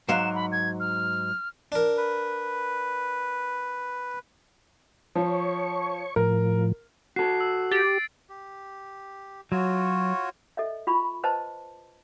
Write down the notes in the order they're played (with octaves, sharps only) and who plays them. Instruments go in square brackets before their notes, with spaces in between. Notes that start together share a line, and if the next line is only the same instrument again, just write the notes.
[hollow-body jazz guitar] G#2 F#3 F5 [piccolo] E7
[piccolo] B5
G#6
F6
[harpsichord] D4 A#4
[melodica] B4
[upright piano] F3 [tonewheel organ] C#5 C#6
[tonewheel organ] A2 F3 [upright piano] A#4
[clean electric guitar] F#4 A4 [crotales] C7
[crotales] E6
[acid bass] G4 [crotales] A6 D7
[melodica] G4
[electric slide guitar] F#3 [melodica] F4 F#4 C#5
[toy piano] A4 D#5 E5
F4 B5 C#6
B4 C5 D#5 A5